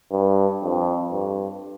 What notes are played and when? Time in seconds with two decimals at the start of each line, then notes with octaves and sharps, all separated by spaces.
0.12 G2
0.63 F2
1.13 G2